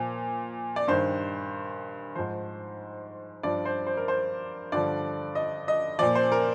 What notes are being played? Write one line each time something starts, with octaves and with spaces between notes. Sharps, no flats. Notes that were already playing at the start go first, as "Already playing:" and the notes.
Already playing: A#2 F3
D5
G2 D#3 C5
G#2 F3 C5
G2 F3 D5
C5
C5
A#4
C5
G2 D3 F3 D5
D#5
D#5
A#2 F3 D5
C5
A#4